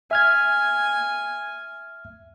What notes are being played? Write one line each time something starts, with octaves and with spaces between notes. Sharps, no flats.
E5 G#5 F6 G#6